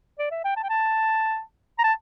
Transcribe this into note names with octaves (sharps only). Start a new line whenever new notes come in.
D5
E5
G5
A5
G5
A5
A#5
A5